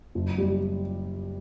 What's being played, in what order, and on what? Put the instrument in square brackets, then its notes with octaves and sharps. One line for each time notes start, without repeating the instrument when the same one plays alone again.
[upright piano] F#1
G3